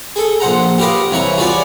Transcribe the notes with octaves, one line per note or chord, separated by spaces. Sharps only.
G#4 A4
A#1 C5 F#5 A#5
G4 A#4 B4 D#5 F5
C2 E3 C#5 A#5
F4 F#4 G#4 B4 C#5 D5